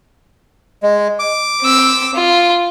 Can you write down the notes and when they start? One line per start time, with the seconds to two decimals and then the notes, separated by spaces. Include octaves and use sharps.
0.83 G#3
1.19 D6
1.61 C4 E6
2.14 F4